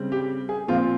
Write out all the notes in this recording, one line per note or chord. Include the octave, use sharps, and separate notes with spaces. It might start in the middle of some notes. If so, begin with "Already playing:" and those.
Already playing: C#3 G3 C4
G4
G#4
A#2 F3 C4 F4